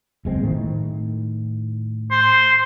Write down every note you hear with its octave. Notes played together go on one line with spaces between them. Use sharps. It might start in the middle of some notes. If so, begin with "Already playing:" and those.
F#1 G#3 C4
A2 D#3
C5